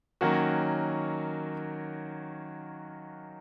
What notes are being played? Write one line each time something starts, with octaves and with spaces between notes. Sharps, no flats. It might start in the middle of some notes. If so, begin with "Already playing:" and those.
D#3 F#3 A#3 C#4 F#4